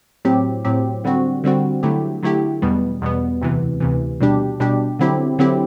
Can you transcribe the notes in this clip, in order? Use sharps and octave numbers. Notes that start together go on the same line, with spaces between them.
A2 F#3 C4 G4
A2 F#3 C4 G4
D3 G3 C4 F#4
D3 G3 C4 F#4
D3 F#3 A3 E4 G4
D3 F#3 A3 E4 G4
E2 B2 G3 B3
E2 B2 G3 B3
D2 C3 E3
D2 C3 E3
B2 G3 D4 G4
B2 G3 D4 G4
D3 F#3 C4 E4 G4
D3 F#3 C4 E4 G4